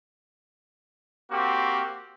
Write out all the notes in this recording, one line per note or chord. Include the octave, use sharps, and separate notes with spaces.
A#3 C4 F#4 G4